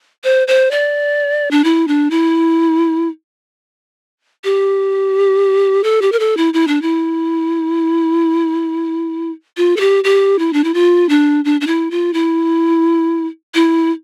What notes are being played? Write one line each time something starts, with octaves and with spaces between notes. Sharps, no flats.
C5
C5
D5
D4
E4
D4
E4
G4
A4
G4
A#4
A4
E4
E4
D4
E4
F4
A4
G4
G4
E4
D4
E4
F4
D4
D4
D4
E4
F4
E4
E4